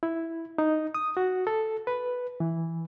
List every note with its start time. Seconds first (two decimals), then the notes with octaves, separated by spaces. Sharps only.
0.03 E4
0.58 D#4
0.95 D#6
1.17 F#4
1.47 A4
1.87 B4
2.40 E3